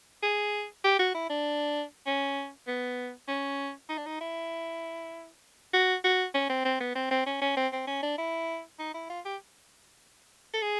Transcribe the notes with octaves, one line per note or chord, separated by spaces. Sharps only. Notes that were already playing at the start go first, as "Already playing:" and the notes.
G#4
G4
F#4
E4
D4
C#4
B3
C#4
D#4
D4
D#4
E4
F#4
F#4
C#4
C4
C4
B3
C4
C4
C#4
C#4
C4
C4
C#4
D4
E4
D#4
E4
F4
G4
A4
G#4